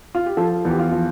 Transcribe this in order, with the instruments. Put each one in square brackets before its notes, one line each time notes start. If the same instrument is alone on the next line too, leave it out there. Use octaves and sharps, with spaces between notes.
[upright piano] F4
G4
[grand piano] F3 [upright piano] A4
[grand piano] E2
[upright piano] G4
F4
[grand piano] F3